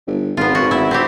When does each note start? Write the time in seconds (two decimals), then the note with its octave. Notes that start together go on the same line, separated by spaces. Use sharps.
0.07 G1
0.37 G#1 B3 F4
0.55 F#4
0.71 E4 E5
0.91 C4 E4 G4